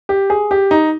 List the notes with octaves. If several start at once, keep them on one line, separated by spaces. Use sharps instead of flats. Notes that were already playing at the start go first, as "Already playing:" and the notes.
G4
G#4
G4
D#4